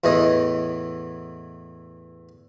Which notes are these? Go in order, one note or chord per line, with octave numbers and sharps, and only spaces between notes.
E2 A2 E3 D#5